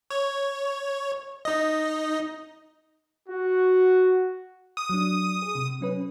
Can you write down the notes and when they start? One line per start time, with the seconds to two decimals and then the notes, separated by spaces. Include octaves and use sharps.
0.11 C#5
1.45 D#4 D#5
3.28 F#4
4.77 D#6
4.89 F#3 D4
5.42 G#4
5.55 C3
5.81 F#3 C#4 B4